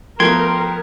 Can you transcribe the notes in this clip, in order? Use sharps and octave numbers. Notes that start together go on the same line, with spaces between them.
F3 A3 B3 A#4 G5 C6 G#6